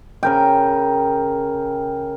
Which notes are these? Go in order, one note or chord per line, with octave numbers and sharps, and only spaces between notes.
C#3 A#4 G5